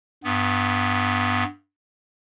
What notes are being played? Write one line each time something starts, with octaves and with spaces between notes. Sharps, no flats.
G2 B3